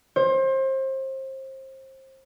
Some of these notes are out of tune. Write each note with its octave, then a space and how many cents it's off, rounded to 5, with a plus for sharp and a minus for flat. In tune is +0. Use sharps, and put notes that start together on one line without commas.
C5 +30